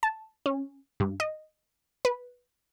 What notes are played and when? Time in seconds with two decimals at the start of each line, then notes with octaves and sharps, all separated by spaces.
0.03 A5
0.46 C#4
1.00 G2
1.20 D#5
2.05 B4